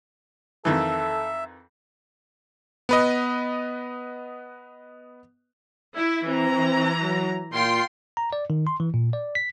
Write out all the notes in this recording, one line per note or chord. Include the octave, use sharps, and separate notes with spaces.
F2 D#3 E3 A4 E5
B3 B4 D#5
E4
E3 C4 A#5
F#3
A#2 F4 G5 C6
A#5
D5
D#3
C6
E3
A#2
D5
B6